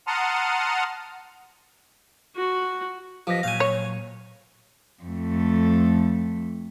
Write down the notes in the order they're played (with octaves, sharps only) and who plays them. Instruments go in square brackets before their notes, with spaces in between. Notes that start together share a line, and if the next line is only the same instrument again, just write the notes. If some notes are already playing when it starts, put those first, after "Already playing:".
[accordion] F#5 A5 A#5 C6 D#6 F6
[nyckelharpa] F#4
[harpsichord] F3 [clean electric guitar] G4 B4 D#5
[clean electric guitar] A#2 F#3 [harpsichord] F5 G#5
[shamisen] C#5
[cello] F2 A3